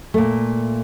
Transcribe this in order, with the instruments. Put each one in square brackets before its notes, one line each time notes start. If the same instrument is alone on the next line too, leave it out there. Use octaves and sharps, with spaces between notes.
[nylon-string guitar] A#2 A3